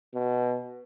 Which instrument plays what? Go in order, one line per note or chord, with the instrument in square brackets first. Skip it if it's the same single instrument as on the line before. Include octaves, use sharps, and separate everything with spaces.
[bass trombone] B2